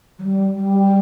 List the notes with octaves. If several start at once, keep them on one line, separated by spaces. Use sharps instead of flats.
F#3
G3
G3